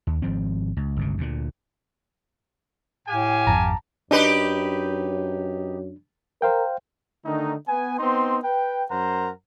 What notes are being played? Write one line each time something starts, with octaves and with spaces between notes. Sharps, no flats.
D#2
G#1 F3 C4
C#2
G1 C#2 C3
D2 A#2
A2 G4 F5 G#5
G#1 F2 A5 A#5
F#2 D4 D#4 G4 B4
A#4 C5 F5 G5
D3 D#3 A3 D#4
B3 G#5
B3 C4 D#4 C6
B4 G5
F#2 A#4 C5 F#5 A#5